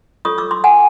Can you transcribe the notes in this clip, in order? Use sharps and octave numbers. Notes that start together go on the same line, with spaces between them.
F4 A4 C#5 C#6 D#6
D6 E6
C6 D6
F#5 G#5